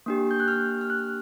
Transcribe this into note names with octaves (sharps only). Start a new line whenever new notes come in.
A#3 D4 G4
G6
F#6
F6
F6
F#6